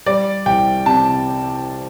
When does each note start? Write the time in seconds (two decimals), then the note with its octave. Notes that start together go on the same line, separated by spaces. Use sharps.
0.06 G3 D5
0.46 C2 G5
0.86 C3 A5